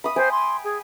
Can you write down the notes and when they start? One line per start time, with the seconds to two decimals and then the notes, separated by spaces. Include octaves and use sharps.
0.04 B5 D#6
0.16 C5 G5 G#5
0.32 C6
0.64 G#4